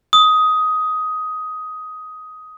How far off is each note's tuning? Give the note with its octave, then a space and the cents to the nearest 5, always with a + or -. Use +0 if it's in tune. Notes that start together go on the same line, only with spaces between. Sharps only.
D#6 +10